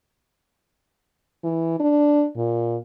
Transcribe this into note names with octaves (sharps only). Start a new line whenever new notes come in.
E3
D4
A#2